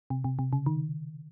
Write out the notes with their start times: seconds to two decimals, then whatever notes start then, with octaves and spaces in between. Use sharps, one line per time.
0.10 C3
0.24 C3
0.39 C3
0.53 C#3
0.66 D#3